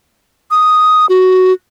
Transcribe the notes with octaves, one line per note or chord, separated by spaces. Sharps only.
D#6
F#4